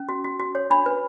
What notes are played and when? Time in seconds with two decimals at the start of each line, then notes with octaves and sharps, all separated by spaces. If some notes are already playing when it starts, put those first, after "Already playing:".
Already playing: C#4
0.09 F#4
0.24 F#4
0.40 F#4
0.55 C#5
0.70 D4 B5
0.86 B4